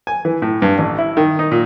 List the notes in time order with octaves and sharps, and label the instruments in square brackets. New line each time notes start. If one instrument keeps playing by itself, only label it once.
[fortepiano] G#5
E3
A2
G2
A1
E4
D#3
D#4
A#2